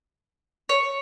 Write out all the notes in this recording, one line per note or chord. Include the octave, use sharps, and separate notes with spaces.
C#5